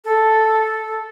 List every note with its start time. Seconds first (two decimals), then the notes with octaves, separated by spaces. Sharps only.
0.05 A4